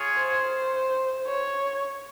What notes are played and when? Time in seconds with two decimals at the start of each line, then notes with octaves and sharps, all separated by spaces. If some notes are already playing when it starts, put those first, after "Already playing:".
Already playing: F4 G#4 C#5
0.17 C5
1.27 C#5